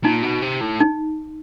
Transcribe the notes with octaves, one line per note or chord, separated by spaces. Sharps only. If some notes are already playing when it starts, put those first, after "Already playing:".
A#2 D#4
B2
C3
A2
D#4